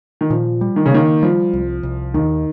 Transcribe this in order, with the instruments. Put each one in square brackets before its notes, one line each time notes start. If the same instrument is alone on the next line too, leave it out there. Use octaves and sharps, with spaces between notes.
[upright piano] D#3
[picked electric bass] A#2 [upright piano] F3
[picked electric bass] G3
[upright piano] D#3
C#3
[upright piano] D#3 [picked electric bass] A#3
[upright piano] F3 [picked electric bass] G3
[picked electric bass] C2
C2
[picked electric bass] D#2 [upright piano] D#3